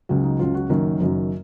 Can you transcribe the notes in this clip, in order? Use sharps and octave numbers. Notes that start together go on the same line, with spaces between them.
C#2 C#3 F#3
D#4
C#2 C#3 F#3 F4
F#4
F#1 F#2 D#3 F#3 A#4
F#1 F#2 D#3 F#3